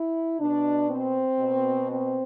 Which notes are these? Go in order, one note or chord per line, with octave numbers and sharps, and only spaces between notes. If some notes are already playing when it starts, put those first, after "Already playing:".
Already playing: E4
B2 D4
C4
B2
C4